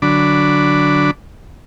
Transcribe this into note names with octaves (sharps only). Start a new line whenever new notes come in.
D3 F#3 D4 B5 D6